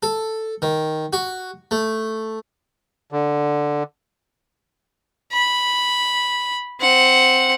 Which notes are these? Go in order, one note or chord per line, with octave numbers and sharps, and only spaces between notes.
A4
D#3
F#4
A3
D3
B5
C4 F#5